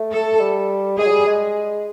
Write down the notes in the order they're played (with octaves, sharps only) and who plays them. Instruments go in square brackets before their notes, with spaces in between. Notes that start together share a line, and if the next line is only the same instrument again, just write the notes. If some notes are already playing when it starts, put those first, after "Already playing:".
Already playing: [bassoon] A3
[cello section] A4
[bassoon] G3
[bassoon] G#3 [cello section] G#4
[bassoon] F#3
G3
G#3